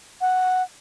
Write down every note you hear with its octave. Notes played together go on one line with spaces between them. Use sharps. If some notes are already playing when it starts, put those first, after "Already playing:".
F#5